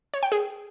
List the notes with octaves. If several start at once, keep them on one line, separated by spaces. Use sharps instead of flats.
C#5
G5
G#4